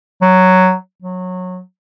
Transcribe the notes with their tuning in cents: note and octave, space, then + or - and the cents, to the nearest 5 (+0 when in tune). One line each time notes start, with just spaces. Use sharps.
F#3 +0
F#3 -20